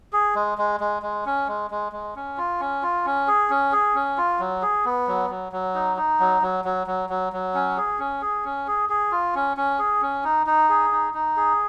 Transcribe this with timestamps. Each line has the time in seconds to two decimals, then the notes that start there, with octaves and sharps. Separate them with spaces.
0.13 G#4
0.35 G#3
0.58 G#3
0.80 G#3
1.02 G#3
1.26 C#4
1.48 G#3
1.71 G#3
1.92 G#3
2.16 C#4
2.38 F4
2.60 C#4
2.83 F4
3.05 C#4
3.28 G#4
3.50 C#4
3.72 G#4
3.95 C#4
4.18 F4
4.40 F#3
4.62 G#4
4.85 B3
5.07 F#3
5.30 F#3
5.52 F#3
5.75 D#4
5.97 D#4
6.20 F#3
6.42 F#3
6.65 F#3
6.87 F#3
7.09 F#3
7.33 F#3
7.54 C#4
7.77 G#4
7.99 C#4
8.22 G#4
8.45 C#4
8.68 G#4
8.89 G#4
9.12 F4
9.35 C#4
9.57 C#4
9.79 G#4
10.02 C#4
10.24 D#4
10.47 D#4
10.69 G#4
10.92 D#4
11.14 D#4
11.37 G#4